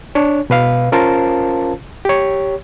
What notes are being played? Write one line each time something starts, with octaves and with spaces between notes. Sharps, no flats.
D4 C#5
B2 B4 F5
C#4 F4 A#4 C5 F5 A5
G4 C#5